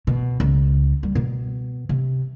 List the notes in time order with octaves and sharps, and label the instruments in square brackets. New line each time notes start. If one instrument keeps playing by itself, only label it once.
[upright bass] B2
C#2
G3
B2
C3